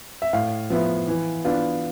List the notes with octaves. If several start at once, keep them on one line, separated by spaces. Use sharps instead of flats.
E5
A2 F5
F3 B3 E4
E3
B3 D4 F4